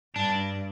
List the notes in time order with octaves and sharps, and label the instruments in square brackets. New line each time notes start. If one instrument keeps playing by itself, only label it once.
[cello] G2 [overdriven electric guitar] D4